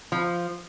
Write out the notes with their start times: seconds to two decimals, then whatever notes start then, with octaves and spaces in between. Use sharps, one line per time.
0.12 F3